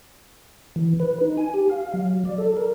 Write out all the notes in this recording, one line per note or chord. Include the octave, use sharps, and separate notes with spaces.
E3
B4
D#4
G#5
G4
F5
F#3
D5
A4
A#4